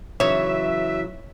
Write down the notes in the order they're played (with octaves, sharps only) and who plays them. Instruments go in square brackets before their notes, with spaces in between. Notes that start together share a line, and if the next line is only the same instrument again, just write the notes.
[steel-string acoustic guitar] C#3 E3 [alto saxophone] F#3 [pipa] D#4 C#5 [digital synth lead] E5